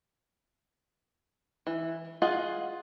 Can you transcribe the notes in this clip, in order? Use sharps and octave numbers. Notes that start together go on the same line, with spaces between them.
E3
F4 G#4 D#5 F#5